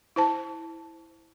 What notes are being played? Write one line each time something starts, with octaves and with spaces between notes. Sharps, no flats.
E4 C5 A5